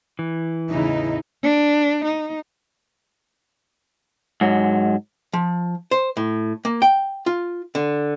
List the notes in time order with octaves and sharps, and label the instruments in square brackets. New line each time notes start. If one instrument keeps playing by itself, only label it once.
[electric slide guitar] E3
[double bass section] E2 A2 C#3 [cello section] D#4 [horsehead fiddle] E4
[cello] D4
D#4
[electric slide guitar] G#2 F#3
[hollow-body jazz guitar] F3
C5
A2
A#3
G5
F4
D3